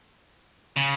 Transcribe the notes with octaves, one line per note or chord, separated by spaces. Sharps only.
C#3